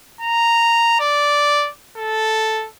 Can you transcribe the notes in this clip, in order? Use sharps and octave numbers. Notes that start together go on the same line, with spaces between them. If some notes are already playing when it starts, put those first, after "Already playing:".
A#5
D5
A4